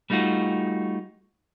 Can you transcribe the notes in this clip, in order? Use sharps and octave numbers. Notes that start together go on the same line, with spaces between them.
G3 A3 D#4 F4 F#4